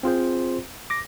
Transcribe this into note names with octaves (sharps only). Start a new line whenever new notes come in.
C4 F4 G#4 C5
D6 A#6